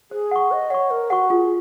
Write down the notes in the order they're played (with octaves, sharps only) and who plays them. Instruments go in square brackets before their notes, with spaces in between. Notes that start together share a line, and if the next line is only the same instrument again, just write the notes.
[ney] G#4 [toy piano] C5
[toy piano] F#5 C#6
[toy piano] C5 [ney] D#5
[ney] C#5 [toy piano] F#5 C#6
[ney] A#4 [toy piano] C5
[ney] F#4 [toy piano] F#5 C#6
[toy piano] F4 [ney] G#4